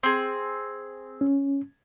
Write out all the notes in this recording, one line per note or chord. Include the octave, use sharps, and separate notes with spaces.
C4 G#4
C#4